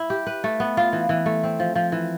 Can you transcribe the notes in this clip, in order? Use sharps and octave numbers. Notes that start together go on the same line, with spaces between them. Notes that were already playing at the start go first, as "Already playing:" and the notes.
Already playing: E4
G4
B4
A3
B3
F4
E3
E3
A3
C4
F3
F3
E3